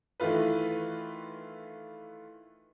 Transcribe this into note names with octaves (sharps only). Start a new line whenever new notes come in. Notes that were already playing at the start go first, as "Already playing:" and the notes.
D#3 E3 A3 F4 B4